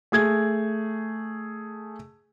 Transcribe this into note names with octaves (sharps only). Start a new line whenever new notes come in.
A3 G#4 G#6